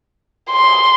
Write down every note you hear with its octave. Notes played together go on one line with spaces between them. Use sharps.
C6